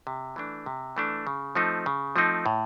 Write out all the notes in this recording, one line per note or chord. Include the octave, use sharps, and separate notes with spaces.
C3
E3 A3 D4
C3
E3 A3 D4
C#3
F3 A3 C4 D#4
C#3
F3 A3 C4 D#4
A2